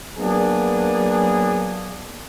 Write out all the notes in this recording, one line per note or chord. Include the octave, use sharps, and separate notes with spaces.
F#3 A#3 B3 D4 G#4